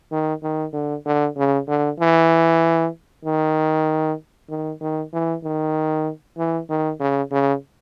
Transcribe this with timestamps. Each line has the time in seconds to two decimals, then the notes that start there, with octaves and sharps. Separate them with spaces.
0.12 D#3
0.43 D#3
0.73 D3
1.06 D3
1.37 C#3
1.68 D3
2.00 E3
3.25 D#3
4.49 D#3
4.81 D#3
5.13 E3
5.44 D#3
6.38 E3
6.70 D#3
7.00 C#3
7.31 C#3